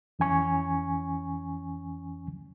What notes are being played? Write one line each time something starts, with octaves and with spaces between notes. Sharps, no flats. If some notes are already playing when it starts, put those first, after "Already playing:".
F2 E3 C#4 G#5 C#6